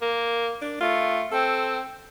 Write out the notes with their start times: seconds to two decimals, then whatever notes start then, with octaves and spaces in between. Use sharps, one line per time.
0.02 A#3
0.61 D4
0.80 A3 F4
1.32 C4 A4